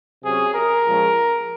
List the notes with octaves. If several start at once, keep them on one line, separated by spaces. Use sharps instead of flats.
C3 F#3 C#4 G#4
A#4
A#2 F3 G#3 C#4